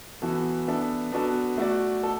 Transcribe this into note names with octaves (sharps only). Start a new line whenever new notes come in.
E3 B3 F#4 A4
B3 D4 A4 E5
B3 D4 F#4 A4
A3 F#4 D5
A4